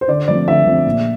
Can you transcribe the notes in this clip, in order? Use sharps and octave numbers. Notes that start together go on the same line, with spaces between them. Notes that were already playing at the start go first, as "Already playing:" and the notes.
C5
D3 D5
F3 A3 C4 D5
D3 E5
F3 A3 C4
A#2